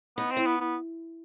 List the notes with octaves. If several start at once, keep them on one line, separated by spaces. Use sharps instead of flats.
B3 D#4
C4
E4
B3
B3